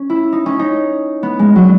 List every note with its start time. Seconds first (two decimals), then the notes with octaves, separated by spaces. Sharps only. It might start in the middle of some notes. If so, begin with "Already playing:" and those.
Already playing: C#4
0.10 E4
0.32 D#4
0.46 C#4
0.59 D#4
1.23 B3
1.39 G#3
1.56 F#3